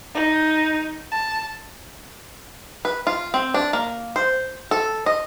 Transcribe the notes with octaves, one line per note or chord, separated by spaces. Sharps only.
D#4
A5
B4
F4
C4
D4
A#3
C5
A4
D#5